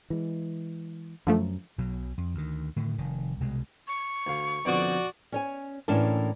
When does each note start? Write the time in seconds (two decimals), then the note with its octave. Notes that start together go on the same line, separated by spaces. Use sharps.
0.10 E3 G#3
1.27 F#2 D3 F3 A3
1.78 B1 B2 F#3
2.18 F2
2.35 D2 D#3
2.76 A2 D3 D#3
2.98 F1 D#3
3.41 C2 B2 G#3
3.88 C#6
4.27 D2 F5
4.65 F2 B2 D3 F#4 D5
5.32 C#4 C#5 G#5
5.88 A2 E3 A#3 C#4 D4 A5